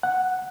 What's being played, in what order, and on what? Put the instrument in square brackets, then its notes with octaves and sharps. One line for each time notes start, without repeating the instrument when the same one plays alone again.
[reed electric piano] F#5